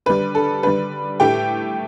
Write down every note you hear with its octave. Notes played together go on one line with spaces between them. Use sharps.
D3 G3 B4
A4
D3 G3 B4
A2 A3 G4 G5